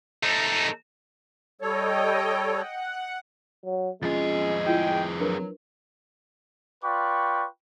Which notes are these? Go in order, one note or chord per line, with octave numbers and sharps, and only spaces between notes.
A3 D#4
G3 A4 C#5 D#5 G5
F#5
F#3
F2 G#3 C#4 F4 G#4 A6
E4 F4 G5
F#3 D4 A#4 B4
F4 B4 D5 G5 C#6